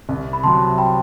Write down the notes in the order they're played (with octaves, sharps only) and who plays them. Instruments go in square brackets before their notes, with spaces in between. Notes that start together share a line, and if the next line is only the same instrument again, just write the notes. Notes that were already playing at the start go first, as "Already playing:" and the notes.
[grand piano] C2
[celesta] B5
[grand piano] C3 F#3 [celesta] A5 C6
[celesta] G5 B5